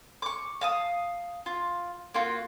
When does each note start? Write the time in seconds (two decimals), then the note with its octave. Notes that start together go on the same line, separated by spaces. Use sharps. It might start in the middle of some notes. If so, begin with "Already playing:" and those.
0.22 C#6 D6
0.61 F5 A5 D#6
1.46 F4
2.14 A#3 F4 F#4